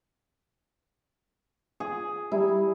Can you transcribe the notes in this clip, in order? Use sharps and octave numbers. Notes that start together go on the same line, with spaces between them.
G#4
G3 E4